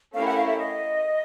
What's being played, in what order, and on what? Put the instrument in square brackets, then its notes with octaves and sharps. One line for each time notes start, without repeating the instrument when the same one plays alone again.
[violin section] A3 C#4 E4 G4 A#4 [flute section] F5
[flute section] F#5
F5
E5
D#5